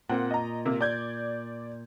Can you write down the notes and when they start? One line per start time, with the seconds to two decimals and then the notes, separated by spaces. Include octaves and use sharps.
0.09 A#2 A#3 C4 F#5
0.31 D#5 A#5
0.65 C3 A#3
0.81 D5 G6 G#6